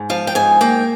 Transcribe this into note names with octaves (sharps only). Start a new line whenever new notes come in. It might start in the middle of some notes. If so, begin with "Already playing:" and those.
Already playing: G#2
F3 F5
G5
G#2 G#5
A#3 G5